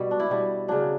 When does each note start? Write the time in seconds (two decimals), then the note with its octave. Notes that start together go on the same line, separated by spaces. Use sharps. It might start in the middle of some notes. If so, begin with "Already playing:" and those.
Already playing: B2 G3
0.11 D4
0.20 E4
0.30 B2 G3
0.68 C#3 F#3 D4